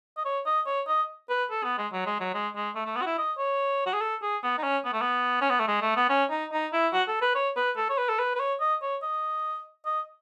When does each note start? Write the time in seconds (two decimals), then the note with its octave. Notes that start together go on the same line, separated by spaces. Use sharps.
0.17 D#5
0.25 C#5
0.46 D#5
0.66 C#5
0.88 D#5
1.29 B4
1.51 A4
1.64 B3
1.78 G#3
1.93 F#3
2.06 G#3
2.20 F#3
2.34 G#3
2.55 G#3
2.75 A3
2.86 A3
2.96 B3
3.02 F#4
3.06 E4
3.18 D#5
3.38 C#5
3.86 F#4
3.94 G#4
4.01 A4
4.22 G#4
4.43 B3
4.58 D#4
4.63 C#4
4.85 B3
4.93 A3
5.01 B3
5.41 C#4
5.50 B3
5.59 A3
5.68 G#3
5.82 A3
5.96 B3
6.10 C#4
6.30 D#4
6.52 D#4
6.73 E4
6.93 F#4
7.08 A4
7.21 B4
7.35 C#5
7.56 B4
7.77 A4
7.90 C#5
7.98 B4
8.09 A4
8.19 B4
8.35 B4
8.40 C#5
8.60 D#5
8.82 C#5
9.02 D#5
9.86 D#5